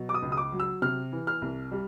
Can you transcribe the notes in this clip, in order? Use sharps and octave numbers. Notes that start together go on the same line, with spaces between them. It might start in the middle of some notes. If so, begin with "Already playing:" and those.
Already playing: B2 F#3
D6
D#6
C#2
D#6
D6
F#3
E6
C3 F6
E3
F6
C2
G3